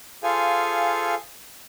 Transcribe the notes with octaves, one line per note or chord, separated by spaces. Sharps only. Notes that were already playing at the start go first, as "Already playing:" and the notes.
F4 G#4 A4 C5 F5 G#5